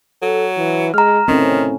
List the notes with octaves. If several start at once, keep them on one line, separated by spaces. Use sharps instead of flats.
F#3 A4
E3
G#3 A#5 F6
A2 D#3 C4 C#4